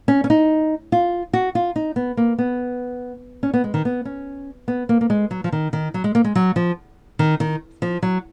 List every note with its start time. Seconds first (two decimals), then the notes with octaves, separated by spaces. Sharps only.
0.08 C#4
0.24 C#4
0.30 D#4
0.92 F4
1.33 F#4
1.55 F4
1.76 D#4
1.96 B3
2.17 A#3
2.38 B3
3.43 C#4
3.54 B3
3.64 G#3
3.74 D#3
3.85 B3
4.05 C#4
4.68 B3
4.89 A#3
5.01 A#3
5.10 G#3
5.31 F#3
5.44 F3
5.52 D#3
5.73 D#3
5.94 F#3
6.04 G#3
6.15 A#3
6.24 G#3
6.35 F#3
6.56 F3
7.19 D#3
7.40 D#3
7.82 F3
8.02 F#3